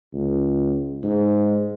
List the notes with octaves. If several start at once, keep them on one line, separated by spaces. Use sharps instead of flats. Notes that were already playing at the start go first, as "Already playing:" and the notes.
C#2
G#2